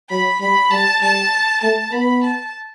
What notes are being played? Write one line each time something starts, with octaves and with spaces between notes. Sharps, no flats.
F#3 B5
G3 B5
G3 A5
G3 A5
A3 A5
B3 B5
A5